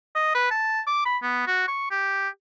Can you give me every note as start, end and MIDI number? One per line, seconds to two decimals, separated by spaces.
0.16 0.32 75
0.35 0.49 71
0.51 0.81 81
0.87 1.05 86
1.06 1.17 83
1.23 1.45 59
1.47 1.67 66
1.68 1.91 85
1.91 2.29 67